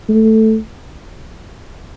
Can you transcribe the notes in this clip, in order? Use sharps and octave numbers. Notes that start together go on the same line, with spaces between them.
A3